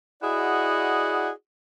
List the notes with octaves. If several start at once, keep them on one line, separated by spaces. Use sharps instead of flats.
E4 F#4 G#4 D5 D#5 F#5